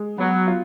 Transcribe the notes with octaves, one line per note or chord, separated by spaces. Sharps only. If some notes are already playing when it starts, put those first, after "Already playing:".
Already playing: G#3
F#3 B3
F4